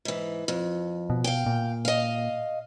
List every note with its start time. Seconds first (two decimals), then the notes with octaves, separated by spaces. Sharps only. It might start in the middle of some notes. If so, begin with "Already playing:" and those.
0.05 G#2 E3
0.48 F2
1.10 B2
1.24 F5 G5
1.46 A#2
1.85 D#5 F5